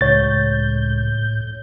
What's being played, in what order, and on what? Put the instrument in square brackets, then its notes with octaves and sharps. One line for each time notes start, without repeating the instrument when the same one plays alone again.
[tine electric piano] C#2 [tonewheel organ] A2 G6 [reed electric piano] C#5 A6